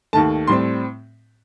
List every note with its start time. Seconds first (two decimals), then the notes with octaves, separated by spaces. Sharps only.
0.13 D#2 D#3 A3 A5
0.47 A2 G3 C4 C6